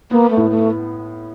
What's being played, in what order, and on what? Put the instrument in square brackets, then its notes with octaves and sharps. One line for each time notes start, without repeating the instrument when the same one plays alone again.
[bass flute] A#3 [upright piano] B3
[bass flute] A3
[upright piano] A2
[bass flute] A3